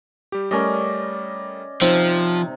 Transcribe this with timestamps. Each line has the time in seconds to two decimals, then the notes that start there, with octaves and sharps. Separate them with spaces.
0.32 G3 G4
0.51 G3 A3 C#4 A#4 D5 D#5
1.81 C3 F3 C4 D#4